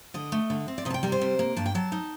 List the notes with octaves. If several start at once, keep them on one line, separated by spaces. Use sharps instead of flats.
D3 D#5
A3
D3
C4
D5
C3 D#5
A5
G5
G3 A#4
C5
C3
A#3
G2 A5
G5
F#3 A5
D#4